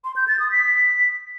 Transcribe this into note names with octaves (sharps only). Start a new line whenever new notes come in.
C6
G6
A6
D#6
B6